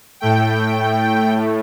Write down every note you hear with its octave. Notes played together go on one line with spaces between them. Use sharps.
A2 A3 G5